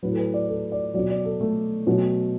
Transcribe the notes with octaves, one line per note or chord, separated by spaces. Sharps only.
A2 F#3 B4
A4
B4
D5
A4
D5
B2 F#3 D5
D5
A4
A3
B2 F#3